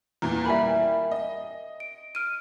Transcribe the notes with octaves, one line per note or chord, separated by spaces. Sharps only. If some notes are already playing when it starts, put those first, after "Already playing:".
E2 A#2 E3 A#5
G3 A#3 E5 G#5 B5
D#5
D7
F6 D7 D#7